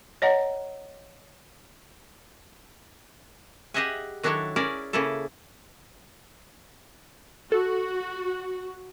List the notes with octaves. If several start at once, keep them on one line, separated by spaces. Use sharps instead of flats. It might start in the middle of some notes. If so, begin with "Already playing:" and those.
C#5 D#5 F#5 A#5
G4 G#4 D#5 E5 F#5 G#5
D#3 F#3 D4 E4 A4 C#5
C#4 E4 G#4 A#4 D5
C#3 A#3 E4 G#4 A4
F#4 A4